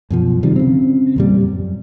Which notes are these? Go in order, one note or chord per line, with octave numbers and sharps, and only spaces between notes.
F#2 B2 F3
C3 D#3 F3 G3
C#3 C4
E2 A#2 G3
F#2